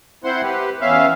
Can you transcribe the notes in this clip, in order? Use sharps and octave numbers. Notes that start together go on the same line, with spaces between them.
C4 E4 C5 F#5 C6
G4 B4
E2 B3 C#4 E5 F5